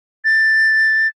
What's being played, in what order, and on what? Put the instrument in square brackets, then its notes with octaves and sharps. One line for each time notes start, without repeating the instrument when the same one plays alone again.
[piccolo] A6